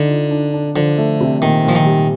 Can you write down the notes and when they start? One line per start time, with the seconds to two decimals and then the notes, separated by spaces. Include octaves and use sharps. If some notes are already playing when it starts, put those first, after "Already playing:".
Already playing: D3 D#4
0.09 F4
0.31 D4
0.54 D4
0.75 D3 F3
0.98 A3
1.21 C3
1.42 A#2 D#3
1.65 A#2 F3
1.75 D#3
1.86 G3